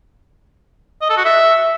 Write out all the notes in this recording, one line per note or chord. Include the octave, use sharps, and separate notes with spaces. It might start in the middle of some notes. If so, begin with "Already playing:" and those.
D#5
A4
F#4
E5